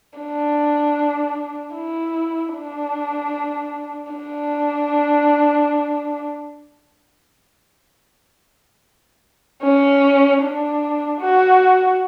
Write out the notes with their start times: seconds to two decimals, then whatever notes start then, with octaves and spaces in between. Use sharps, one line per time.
0.19 D4
1.76 E4
2.55 D4
4.13 D4
9.63 C#4
10.42 D4
11.21 F#4